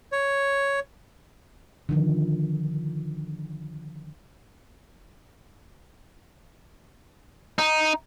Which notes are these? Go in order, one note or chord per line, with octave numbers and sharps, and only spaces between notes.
C#5
D3 D#3 F3
D#4